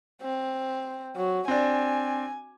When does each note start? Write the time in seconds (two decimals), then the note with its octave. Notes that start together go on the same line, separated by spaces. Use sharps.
0.22 C4
1.16 F#3
1.48 C4 D4 G#5